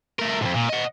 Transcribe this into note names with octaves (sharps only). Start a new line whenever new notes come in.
A3 A#4
F2 G#2
A#2
D#5 F#5